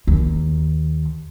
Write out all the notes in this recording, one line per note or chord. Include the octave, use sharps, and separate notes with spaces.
D#2